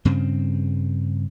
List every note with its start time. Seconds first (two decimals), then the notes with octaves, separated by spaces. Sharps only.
0.05 G2 C#3 C4